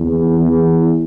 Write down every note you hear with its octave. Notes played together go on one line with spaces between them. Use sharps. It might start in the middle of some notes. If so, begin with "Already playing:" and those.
Already playing: E2
E2